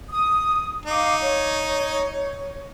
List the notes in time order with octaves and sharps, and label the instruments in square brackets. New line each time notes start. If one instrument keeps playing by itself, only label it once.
[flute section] D#6
[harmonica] D#4 [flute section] F5 D6
[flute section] C#5